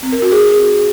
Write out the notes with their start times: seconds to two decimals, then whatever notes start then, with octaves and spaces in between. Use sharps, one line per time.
0.03 C4
0.12 A#4
0.22 F#4
0.32 G#4